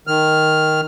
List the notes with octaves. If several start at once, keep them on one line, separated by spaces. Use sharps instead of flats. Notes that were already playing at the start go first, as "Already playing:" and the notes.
D#3 F6